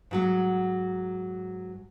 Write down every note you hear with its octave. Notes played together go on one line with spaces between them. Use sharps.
G#2 F#3 F#4